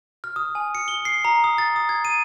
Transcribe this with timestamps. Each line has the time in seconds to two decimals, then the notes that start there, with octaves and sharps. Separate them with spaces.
0.24 F6
0.36 D#6
0.55 G#5
0.75 C#7
0.88 G7
1.05 C7
1.25 A#5
1.44 D#6
1.58 A6
1.76 D#6
1.89 G#6
2.05 D#7